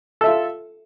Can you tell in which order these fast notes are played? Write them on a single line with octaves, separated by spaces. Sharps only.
A4 E5 F4